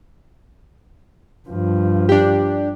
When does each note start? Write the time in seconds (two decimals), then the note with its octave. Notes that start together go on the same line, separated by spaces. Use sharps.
1.49 G2 F3
2.09 D4 G4